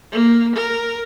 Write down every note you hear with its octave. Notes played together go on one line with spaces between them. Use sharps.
A#3
A#4